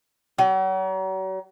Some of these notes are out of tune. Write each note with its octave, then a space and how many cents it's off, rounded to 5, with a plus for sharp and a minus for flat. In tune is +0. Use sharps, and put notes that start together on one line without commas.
F#3 +40